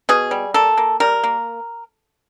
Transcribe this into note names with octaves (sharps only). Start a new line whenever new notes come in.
B2 G#4
G3
A#3 A4
A#3
G3 A#4
A#3